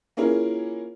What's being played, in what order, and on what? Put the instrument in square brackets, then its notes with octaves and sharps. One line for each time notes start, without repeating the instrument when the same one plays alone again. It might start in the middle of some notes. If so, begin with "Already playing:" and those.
[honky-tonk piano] A#3 C#4 E4 F4 G#4 A#4